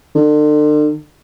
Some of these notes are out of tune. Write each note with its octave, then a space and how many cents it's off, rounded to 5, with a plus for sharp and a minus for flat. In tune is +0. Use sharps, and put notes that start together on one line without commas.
D3 +40